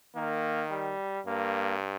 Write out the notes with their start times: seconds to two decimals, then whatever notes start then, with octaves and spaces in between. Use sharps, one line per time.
0.15 D#3 A#3
0.70 G3
1.26 G2 A#3